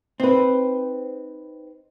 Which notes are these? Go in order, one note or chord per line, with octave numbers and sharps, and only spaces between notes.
C4 D#4 B4